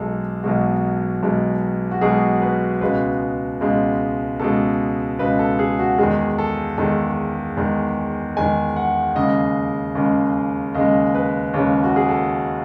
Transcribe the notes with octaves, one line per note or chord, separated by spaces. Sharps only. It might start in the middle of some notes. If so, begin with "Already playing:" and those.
Already playing: B1 B2 G#3 A4
B1 B2 G#3 F#4
B1 B2 G#3
F#4
B1 B2 G#3 G#4
B4
C#2 B2 G#3 B4
C#2 B2 G#3
C#2 B2 G#3 A4
C#2 B2 G#3 B4
A4
G#4
F#4
E2 D#3 G#3 G#4
A4
E2 D#3 G#3 A4
E2 D#3 G#3
E2 D#3 G#3 G#5
F#5
D#2 C#3 G#3 D#5
D#2 C#3 G#3
D#2 C#3 G#3 D#5
B4
D#2 C#3 G#3 C#5
F#4
G#4
A4